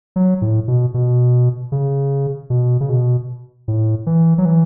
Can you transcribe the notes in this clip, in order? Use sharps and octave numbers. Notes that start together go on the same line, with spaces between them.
F#3
A2
B2
B2
C#3
B2
C#3
B2
A2
E3
F#3
E3